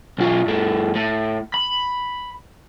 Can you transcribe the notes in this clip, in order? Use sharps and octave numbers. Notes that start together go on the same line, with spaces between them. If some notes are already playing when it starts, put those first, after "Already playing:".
B1 F4
G2 A3
A2
B5